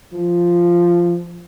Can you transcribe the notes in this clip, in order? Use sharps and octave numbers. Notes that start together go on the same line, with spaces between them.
F3